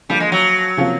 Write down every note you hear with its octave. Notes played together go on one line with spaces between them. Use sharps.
D3 F3 G3 A#3
G#3
F#3
C3 F3 A#3 C#4 F4